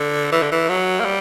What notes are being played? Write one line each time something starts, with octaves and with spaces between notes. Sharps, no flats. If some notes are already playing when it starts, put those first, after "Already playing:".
Already playing: D3
E3
D3
E3
F#3
A#3
G3